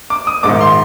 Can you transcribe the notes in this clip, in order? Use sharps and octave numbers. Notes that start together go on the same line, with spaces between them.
D6
D#6
A#1 G#2 D#3 D6
C6